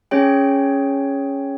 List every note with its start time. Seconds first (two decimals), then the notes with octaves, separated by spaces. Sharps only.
0.11 C#4 G#4 C#5 G5